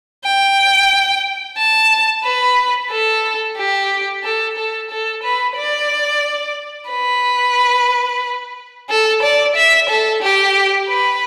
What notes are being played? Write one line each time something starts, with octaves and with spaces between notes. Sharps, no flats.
G5
A5
B4
A4
G4
A4
A4
A4
B4
D5
B4
A4
D5
E5
A4
G4
B4